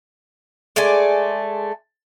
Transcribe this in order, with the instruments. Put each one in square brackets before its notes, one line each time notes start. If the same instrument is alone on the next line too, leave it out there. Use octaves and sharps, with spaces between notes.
[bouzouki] G#3 A3 D5 G#5